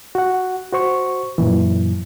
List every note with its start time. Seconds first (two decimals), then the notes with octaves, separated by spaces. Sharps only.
0.15 F#4 F#5
0.73 F#4 C5 C#6
1.38 F#2 A#2 E3